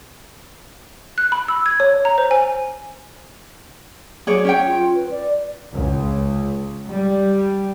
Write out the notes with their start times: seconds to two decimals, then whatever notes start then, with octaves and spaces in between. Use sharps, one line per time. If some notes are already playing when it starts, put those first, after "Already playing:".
1.18 F#6
1.32 B5
1.48 E6
1.66 G#6
1.80 C#5
2.05 A#5
2.18 C5
2.31 G#5
4.27 F#3 G#4 C#5 D5
4.45 C#4 C#5 G5
4.66 F4
4.95 B4
5.11 D5
5.74 C#2
6.89 G3